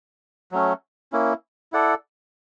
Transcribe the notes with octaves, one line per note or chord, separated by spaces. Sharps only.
F#3 A3 C#4
A#3 C#4 E4
E4 A4 D5 F#5